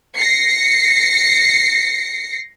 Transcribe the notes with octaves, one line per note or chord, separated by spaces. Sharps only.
A#6 C7 C#7